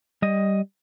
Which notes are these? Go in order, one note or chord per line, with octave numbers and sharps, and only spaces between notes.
G3 D#5